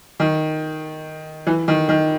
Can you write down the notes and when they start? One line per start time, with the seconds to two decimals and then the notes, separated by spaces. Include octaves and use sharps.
0.20 D#3
1.47 E3
1.68 D#3
1.89 D#3